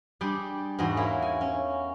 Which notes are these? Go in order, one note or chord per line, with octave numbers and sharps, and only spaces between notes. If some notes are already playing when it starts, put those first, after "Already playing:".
G3 D4 G4 G#4 G5 C6
E2 G#2 F#4 G#4 C6
A#3 C#4 E4 F#4
G#5
C#4